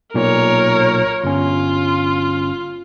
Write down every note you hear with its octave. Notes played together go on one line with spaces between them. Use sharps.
B1 A#2 A#4 C#5
G1 C#4 F4